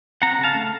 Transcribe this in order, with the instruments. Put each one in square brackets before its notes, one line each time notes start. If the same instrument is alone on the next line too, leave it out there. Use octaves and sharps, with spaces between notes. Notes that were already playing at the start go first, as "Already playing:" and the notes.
[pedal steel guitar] C4 F#5 A#5
C#3
F5 A5
A3